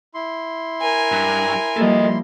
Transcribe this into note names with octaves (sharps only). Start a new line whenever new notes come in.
E4 C6
A#4 G#5
G2
F3 G3 A#3 A4 D#5